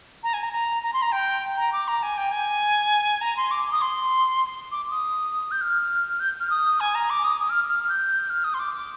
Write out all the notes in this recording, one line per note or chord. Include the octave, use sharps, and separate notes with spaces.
A#5
G#5
A#5
A#5
A#5
C6
A#5
G5
A#5
D6
A#5
G#5
G5
G#5
A#5
C6
D6
D#6
C6
D6
D#6
G6
F6
G6
F6
D#6
G#5
A#5
D6
D#6
D#6
F6
F6
F6
G6
F6
D#6
C6
D6
D6